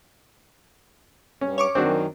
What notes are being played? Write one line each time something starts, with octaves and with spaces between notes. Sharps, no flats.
G2 C#4
C#5 C#6 D6
F#2 D#3 C4 D4 F#4